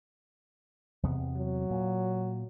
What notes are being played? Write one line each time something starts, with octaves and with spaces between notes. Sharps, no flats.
E2 C3 B3
F#3
A#2